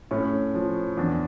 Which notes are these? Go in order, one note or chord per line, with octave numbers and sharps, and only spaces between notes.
A2 C#4
F3
E2 D4